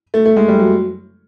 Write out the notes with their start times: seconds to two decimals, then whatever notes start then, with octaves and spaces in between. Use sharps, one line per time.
0.14 A3
0.26 A3
0.36 G#3
0.48 G3
0.59 F#3